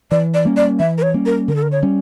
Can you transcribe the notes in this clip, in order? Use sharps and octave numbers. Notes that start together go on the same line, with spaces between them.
E3 D5
D5
G3 A#3 C#4
D5
E3 E5
A#4
C#5
G3 A#3 C#4
A#4
D3 A#4
A4
A#4
C#5
G3 C#4